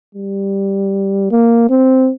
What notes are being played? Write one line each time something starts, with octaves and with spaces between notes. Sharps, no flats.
G3
A#3
C4